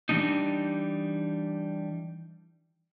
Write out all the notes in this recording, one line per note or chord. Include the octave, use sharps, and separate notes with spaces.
E3 G3 A3 D4 D#4